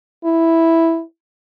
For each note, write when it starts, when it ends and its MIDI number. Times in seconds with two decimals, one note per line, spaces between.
0.25 1.01 64